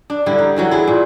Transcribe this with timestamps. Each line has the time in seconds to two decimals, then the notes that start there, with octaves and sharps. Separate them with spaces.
0.10 D4
0.26 D3 G3 E4
0.38 D#4
0.56 D3 E3 F#3
0.71 E4 G#4
0.87 A#2